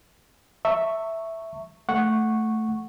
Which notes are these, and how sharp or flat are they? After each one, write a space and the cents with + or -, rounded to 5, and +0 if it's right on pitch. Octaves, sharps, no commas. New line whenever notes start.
E5 +0 A5 +40 C#6 +0
A3 +0 F#5 +0 C#6 -5